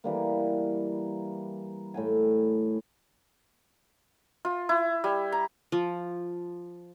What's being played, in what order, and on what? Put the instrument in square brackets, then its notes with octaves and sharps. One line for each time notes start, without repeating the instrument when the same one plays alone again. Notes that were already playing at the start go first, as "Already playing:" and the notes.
[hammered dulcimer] E3 G3 A#3
A2 G5 G#5
[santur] F4
E4
G3
A#5
[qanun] F3